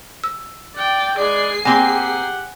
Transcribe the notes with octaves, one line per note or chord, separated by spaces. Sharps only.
E6
D5 G5
G#3 G#4 B4 D5 C7
A#3 C4 G4 F#5 G#5